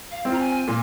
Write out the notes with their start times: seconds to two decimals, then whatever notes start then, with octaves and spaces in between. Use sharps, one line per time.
0.11 F5
0.25 C4
0.30 F4 A#5
0.39 G#5
0.67 A#2